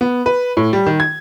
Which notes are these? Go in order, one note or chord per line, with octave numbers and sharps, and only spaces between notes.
B3
B4
A2
G3
D#3
G#6